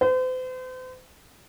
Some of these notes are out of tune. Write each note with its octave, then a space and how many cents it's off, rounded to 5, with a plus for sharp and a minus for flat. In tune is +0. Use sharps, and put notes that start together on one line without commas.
C5 -40